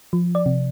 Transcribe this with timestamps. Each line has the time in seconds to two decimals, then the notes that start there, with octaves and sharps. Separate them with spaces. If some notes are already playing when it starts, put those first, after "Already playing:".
0.13 F3
0.35 D5
0.46 C3